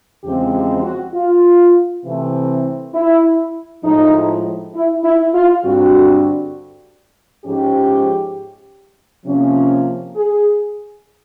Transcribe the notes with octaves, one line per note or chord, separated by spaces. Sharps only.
E2 C#3 F3 G#3 C4 G4
G4
F#4
F4
C3 E3 A3 C4
E4
A2 F3 G#3 D#4
E4
E4
F4
G2 D3 G3 C4 F#4
G#2 F3 G#3 C#4 G4
C3 F3 A#3 C#4
G#4